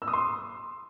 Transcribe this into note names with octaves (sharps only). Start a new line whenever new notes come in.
E6
D#6
C6